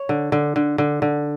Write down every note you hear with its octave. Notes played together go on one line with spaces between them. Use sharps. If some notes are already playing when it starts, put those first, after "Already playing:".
Already playing: C#5
D3
D3
D3
D3
D3